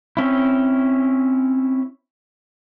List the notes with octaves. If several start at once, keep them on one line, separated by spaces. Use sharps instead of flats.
C4 C#4 E4